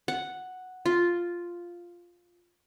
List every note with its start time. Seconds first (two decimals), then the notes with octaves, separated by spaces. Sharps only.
0.08 F#5
0.86 F4